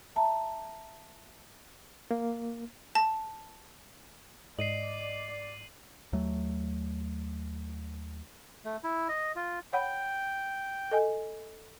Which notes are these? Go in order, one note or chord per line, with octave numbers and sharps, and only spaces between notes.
E5 A5 A#5
A#3
A5
G#2 D5 D#5 C7 D#7 F#7
D#2 F#3 A3
A3
E4
D#5
F4
C#5 F#5 G5 B5
A4 D#5 G#5